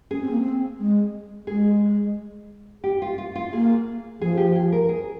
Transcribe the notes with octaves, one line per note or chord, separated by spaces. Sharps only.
C#4 G#4
C4
A#3
C4
G#3
G#3 G#4
G4
F4
F4
F4
A#3 G#4
F3 G#4
G4
G#4
A#4
G#4